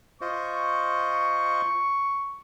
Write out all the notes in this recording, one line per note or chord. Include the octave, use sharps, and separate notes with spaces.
F4 C5 D#5 C#6